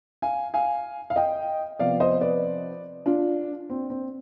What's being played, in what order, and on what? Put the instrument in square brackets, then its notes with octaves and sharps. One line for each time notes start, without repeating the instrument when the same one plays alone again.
[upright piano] F5 G#5
F5 G#5
F5
D#5 G5
C3 F3 B3 D5 F5
C5 D#5
B4 D5
D4 F4
C4
C4